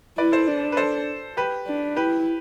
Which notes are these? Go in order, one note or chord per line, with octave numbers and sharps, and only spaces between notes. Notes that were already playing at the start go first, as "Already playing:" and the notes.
E4 B4 D5
A4 C5
D4
B4
A4 C5
G4 B4
D4
E4 G4 B4